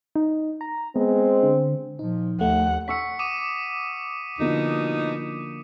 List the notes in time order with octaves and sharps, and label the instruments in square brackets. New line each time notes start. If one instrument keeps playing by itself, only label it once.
[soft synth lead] D#4
A#5
[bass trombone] G#3 [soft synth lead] B3 [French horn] C4
[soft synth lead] D3
[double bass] A#2 F3 [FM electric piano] D#4
[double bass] D#2 [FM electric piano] A3 [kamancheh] F#5
[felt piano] F#5 C#6 E6 [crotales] B6 C#7
[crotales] D6 D#6 D#7
[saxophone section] B2 D#4 [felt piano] D3 F3 A#3